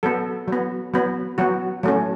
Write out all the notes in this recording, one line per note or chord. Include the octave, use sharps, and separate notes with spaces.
F#3 B3 A4
F#3 B3
F#3 B3
F#3 B3 F#4
F#3 A3 C#4